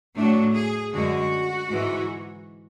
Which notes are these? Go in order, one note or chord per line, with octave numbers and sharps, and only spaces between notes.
A2 F#3 A3 D4
G#4
F#2 D3 G#3 F#4
G#2 E3 G#3